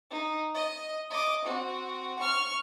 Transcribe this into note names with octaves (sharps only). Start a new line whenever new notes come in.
D#4
D#5
D#5 D6
C4 F#4
C#6 F6